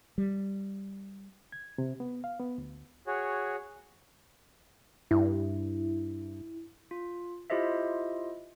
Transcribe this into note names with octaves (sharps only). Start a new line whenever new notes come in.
G3
G#6
C3
B3
F5
B3
D2
F#4 G#4 C#5
G2 E4
F4
E4 F4 G4 C5 D#5 E5